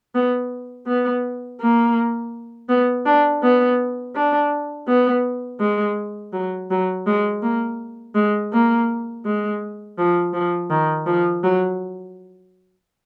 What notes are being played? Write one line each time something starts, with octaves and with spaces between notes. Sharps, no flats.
B3
B3
A#3
B3
D4
B3
D4
B3
G#3
F#3
F#3
G#3
A#3
G#3
A#3
G#3
F3
F3
D#3
F3
F#3